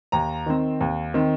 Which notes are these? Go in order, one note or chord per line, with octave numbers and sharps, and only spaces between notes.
D#2 A#5
D#3 C4
D#2
D#3 C4